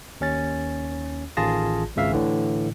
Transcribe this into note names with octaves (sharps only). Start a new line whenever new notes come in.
D#2 C#4 A6
A1 D#3 F4 G#4 A5 A#6
G#1 C#2 C#3 E5 F5
A2 D3 E3